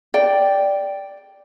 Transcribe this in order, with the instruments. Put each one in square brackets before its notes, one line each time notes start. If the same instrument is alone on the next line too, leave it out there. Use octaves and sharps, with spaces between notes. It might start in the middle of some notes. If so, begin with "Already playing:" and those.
[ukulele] D5 G5